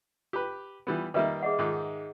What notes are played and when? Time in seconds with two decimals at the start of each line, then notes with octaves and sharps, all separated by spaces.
0.33 G4 B4
0.87 E3 G3 B3
1.14 D#3 G3 A#3 B4 D#5 E5
1.43 G#4 D#5 F#5
1.59 G#2 D#3